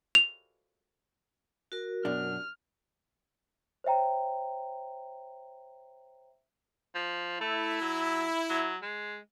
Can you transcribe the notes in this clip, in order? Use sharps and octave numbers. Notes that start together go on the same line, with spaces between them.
F7
F#4 A#4
F#2 B2 D4 F6
C5 C#5 E5 G5 A#5
F3
A3 E4
F#3
F#3
G#3